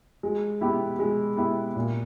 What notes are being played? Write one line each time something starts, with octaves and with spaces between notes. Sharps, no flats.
G#3
B3 E4 G4
G#3
B3 E4 G4
A#2